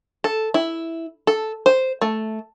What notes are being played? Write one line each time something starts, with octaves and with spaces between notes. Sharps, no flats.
A4
E4
A4
C5
A3